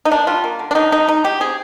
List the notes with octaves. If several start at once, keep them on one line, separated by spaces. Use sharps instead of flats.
D#4
A#3 D4
G3 F4
A#3
D3
D4
D3 D#4
G#3 D#4
G#3 D#4
G#3 G4
C4 G#4